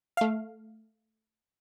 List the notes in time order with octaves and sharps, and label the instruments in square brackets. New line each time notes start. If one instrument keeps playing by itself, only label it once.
[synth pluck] A3 F5